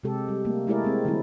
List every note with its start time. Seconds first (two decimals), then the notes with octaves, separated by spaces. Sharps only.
0.04 C3 G#3 G4 A4
0.28 G3
0.45 G3 A3 A#3
0.67 G#3 A3 E4 G#4 A#4 D5
0.84 G#3 C4
1.05 D3 F#3 G#3 C4 E4